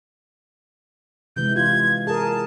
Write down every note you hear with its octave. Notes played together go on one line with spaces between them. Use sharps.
C3 E3 G#3 G6
F4 G#6
G#4 A#4 A5